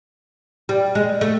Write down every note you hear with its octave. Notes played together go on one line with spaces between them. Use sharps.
G3
G#3
A3